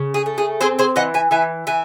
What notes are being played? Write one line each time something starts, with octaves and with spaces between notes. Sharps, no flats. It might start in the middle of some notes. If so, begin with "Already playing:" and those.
Already playing: C#3
G#4
A3
G#4
C4 G#4 C5
G#4 C5
E3 D#5 F#5
E5 G#5
E3 E5 G#5
E3 E5 G#5